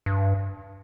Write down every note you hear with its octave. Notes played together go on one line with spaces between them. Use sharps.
G2